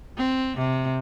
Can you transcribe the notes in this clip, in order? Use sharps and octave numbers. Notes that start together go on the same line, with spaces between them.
C4
C3